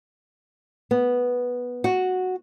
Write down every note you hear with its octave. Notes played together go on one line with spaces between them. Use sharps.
B3
F#4